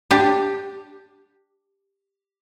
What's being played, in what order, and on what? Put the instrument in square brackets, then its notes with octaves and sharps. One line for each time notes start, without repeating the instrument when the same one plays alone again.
[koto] D4 G4